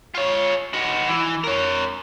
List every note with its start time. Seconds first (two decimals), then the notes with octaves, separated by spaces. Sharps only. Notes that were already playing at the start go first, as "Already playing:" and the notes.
0.14 F4 C#5
0.73 D#4 F#4
1.09 E3
1.44 A#4 C#5